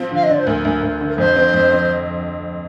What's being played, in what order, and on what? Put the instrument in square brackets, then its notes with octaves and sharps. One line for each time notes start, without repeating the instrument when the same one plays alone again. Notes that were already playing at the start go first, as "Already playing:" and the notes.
Already playing: [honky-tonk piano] F3 C4
[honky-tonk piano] D3 [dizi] F5
[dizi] D#5
[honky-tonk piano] D3 [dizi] D5
[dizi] C5
[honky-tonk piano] D2 [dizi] A#4
[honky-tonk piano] D2
D2
D3
[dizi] A#4
[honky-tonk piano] F2 [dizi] C5
[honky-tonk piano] C4
F2
C4